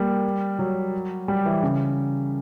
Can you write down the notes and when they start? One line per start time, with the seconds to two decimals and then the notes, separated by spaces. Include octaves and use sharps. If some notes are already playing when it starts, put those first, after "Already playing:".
Already playing: G3 A#3
0.59 F#3
1.28 G3
1.46 E3
1.63 C#3